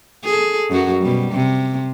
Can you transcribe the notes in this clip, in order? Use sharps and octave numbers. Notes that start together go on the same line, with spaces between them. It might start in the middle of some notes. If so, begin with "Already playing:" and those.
G#4 A4
F#2 F#3 F#4
B2 G3
C3